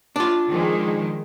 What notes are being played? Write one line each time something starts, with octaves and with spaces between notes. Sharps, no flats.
D4 F4
D#3 F3 G#3